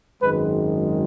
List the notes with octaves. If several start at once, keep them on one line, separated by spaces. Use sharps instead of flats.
G#1 F#2 D#3 G#3 B4